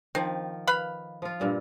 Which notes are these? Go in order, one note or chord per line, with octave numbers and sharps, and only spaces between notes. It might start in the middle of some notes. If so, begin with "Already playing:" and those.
D#3 F3 C4
B4 F5 B5
F3 F4
G2 A#2 G3